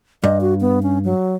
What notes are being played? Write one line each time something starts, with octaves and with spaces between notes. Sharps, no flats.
G2 D#5
F#4
B3
C#4
F#3